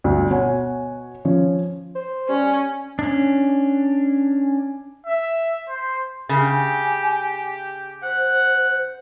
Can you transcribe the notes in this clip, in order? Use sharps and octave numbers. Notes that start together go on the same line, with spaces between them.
G1 D2
B2 C#5 F#5 G#5
F3 C#4
C5
G3 C#4
C#4 D4
E5
C5
C#3 G4 G#5
C5 F#5